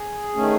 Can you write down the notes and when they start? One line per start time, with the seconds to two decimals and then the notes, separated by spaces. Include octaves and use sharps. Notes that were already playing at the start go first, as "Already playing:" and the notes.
Already playing: G#4
0.35 D#3 A3 C#4